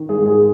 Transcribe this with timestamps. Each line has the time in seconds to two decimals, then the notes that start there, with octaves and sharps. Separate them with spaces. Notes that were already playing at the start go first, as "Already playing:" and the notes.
Already playing: D#3
0.09 G#3 G#4
0.18 G#2
0.26 G#3 G#4